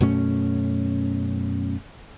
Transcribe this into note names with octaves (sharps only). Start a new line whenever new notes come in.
F#2 B2 A3 C#4